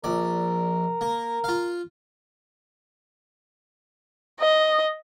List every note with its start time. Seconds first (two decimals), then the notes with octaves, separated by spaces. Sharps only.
0.04 A#1 A#4 D5
1.01 A#3
1.44 F4 F5
4.40 D#5